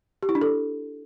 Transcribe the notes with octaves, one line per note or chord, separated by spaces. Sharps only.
G4
E4
D4
A4